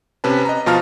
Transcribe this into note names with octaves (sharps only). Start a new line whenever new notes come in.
C3 C#4 B4 A5
D#5 A#5
B2 F3 F4 A5 A#5 F6